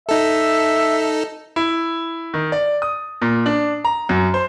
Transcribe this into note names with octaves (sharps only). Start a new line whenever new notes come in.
D#4 A4 E5
E4
D#3
D5
D#6
A#2
D4
A#5
F#2
C5